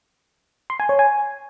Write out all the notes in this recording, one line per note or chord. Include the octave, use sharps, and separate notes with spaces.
C6
G#5
C#5
G#5